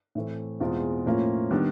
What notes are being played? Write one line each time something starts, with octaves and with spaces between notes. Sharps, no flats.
A2 E3 A3 C4
E2 B2 G#3 C4 F4
A2 F3 A#3 C#4 F4
D#3 G3 B3 D4